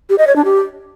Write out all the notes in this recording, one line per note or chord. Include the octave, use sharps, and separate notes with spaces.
G4
D#5
C#5
D4
G4